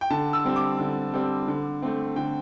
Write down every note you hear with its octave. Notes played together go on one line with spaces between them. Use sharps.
G5
D3 A5
E6
G3 C4
D6
D3
G3 C4
D3
A3 C4
D3 G5